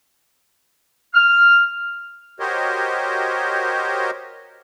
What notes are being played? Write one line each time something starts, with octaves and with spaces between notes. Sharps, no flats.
F6
F#4 G4 A#4 C5 C#5 D#5